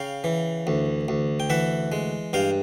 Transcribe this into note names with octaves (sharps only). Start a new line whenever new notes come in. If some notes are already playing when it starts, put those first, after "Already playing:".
Already playing: C#3 F5 G5
E3
D2
D2
G5
E3 E5 F#5
G#3
G2 F5 G5